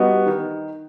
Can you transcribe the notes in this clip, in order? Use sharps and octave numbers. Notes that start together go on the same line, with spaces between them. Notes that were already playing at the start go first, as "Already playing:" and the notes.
Already playing: G3 B3 D#4 F#4
D#3